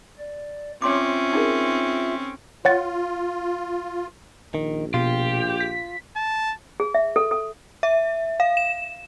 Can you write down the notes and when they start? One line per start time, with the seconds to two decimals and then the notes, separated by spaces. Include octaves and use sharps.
0.19 D5
0.82 C4 C#4 F4 C#5 E5 C6 D6
1.33 D#4 G#4 A#4
2.65 F4 C#5 F#5 A6
4.55 A#1 D#3
4.94 B2 F4 G4
5.61 B6
6.16 A5
6.80 G#4
6.94 E5
7.16 A4
7.31 A4
7.83 E5
8.40 F5
8.57 E7